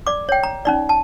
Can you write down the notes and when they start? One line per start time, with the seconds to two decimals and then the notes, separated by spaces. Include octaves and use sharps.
0.07 D5 D6
0.29 C#5 G5
0.43 A#5
0.65 C#4 D#4 D5
0.89 A5